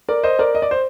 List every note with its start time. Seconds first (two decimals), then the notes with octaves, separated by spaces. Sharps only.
0.09 A#4 D5
0.23 C5 D#5
0.39 A#4 D5
0.55 D#5
0.62 D5
0.71 C5